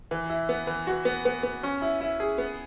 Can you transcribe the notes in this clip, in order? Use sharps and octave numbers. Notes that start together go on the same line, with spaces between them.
E3
E4
B3
E3
F#4
B3
B3
B3
C#4
E4
E4
G#4
B3